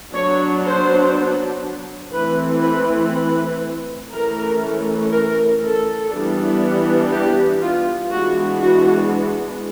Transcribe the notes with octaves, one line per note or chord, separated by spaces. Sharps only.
F#3 B3 D4 C#5
C5
E3 A3 C4 B4
B4
B4
E3 A3 C#4 A#4
A#4
A4
E3 G3 B3 D4
G4
F4
E3 G#3 B3 D4 F#4
F#4